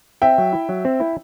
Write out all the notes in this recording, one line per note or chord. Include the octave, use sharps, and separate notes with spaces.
C4 E5 G5
F#3
E4
F#3
C4
E4